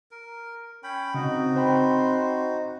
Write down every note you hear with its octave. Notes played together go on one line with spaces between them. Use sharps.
A#4
C#4 G5 B5
C#3 C4 D#4 F#4 D#5
C5 G5 B5 C6